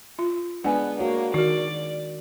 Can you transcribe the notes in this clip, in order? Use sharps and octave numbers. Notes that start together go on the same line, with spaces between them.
F4
G#3 B3 D4 F#5 G#5
A#3 F#4 C#5
D#3 F#4 A#4 D5